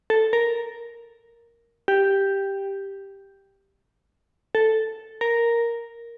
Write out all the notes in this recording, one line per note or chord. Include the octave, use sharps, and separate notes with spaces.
A4
A#4
G4
A4
A#4